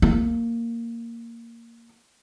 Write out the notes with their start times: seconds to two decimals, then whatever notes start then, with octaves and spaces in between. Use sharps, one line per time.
0.02 A#3